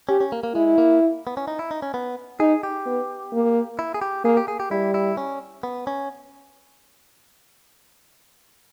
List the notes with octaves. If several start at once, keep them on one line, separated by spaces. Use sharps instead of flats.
C#4 G4
C#4
A#3
A#3
G#3 E4
A#3
B3
C#4
D#4
E4
D#4
C#4
B3
D#4 G#4
G4
B3
A#3
E4
G#4
G4
A#3 G#4
G4
G#4
G4
G3 E4
E4
C#4
B3
C#4